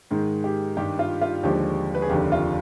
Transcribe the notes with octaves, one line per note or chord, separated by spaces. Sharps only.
G#2 D#3 G#3
G4
G2 D#3 G3 D4 G4
F4
F4
D#2 D3 F3 G#3 G4
B4
G#4
F1 D#2 D3 G4
F4